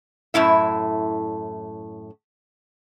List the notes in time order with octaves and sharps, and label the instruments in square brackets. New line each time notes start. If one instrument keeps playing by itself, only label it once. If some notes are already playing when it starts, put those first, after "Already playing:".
[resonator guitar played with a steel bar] F#2 A2 E4 E5